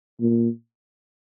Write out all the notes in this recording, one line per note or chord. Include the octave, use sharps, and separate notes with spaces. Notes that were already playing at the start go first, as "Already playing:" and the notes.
A#2